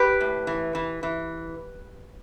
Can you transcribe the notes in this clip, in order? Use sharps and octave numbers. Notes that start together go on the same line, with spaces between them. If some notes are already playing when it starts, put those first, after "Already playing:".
Already playing: G4 B4
A2
E3
E3
E3